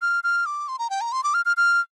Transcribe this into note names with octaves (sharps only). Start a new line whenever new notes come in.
F6
F6
D6
C6
A#5
G5
A#5
C6
D6
F6
F6
F6